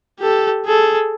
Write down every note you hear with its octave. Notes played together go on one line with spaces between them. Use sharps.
G4 A4
G#4 A4